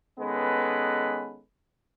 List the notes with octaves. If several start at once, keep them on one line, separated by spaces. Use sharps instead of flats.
D#3 G#3 B3 C#4 A4 B4